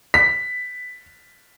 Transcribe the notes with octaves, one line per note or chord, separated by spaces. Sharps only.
B6